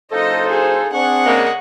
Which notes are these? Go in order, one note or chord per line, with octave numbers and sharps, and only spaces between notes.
F#1 D#4 F4 A4 C5 D#5
G#4
C4 D4 G#4 F#5 C#6
C#3 G#3 A#3